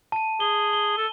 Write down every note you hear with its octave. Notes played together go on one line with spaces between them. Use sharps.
A5 D#7
G#4 G7
G7
A4